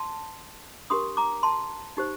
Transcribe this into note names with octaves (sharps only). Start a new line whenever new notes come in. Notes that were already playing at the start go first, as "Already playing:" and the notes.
Already playing: A5 C6
D4 G4 A#4 C6 D#6
A#5 D6
A5 C6
D#4 G4 C5